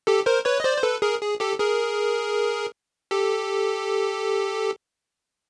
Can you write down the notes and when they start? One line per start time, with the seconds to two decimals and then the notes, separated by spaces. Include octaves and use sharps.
0.07 G4 A4
0.26 A#4 C5
0.45 B4 C#5
0.60 D#5
0.64 C5 D5
0.77 C5
0.83 A4 B4
1.02 G#4 A#4
1.21 G#4
1.40 G4 A4
1.59 G#4 A#4
3.11 G4 A4